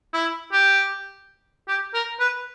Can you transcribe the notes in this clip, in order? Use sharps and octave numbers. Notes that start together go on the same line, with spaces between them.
E4
G4
G4
A#4
B4